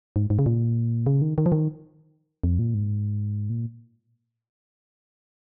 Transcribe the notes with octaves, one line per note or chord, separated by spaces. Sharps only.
G#2
G#2
C#3
A#2
C#3
D#3
D#3
F3
D#3
F2
A#2
G#2
A#2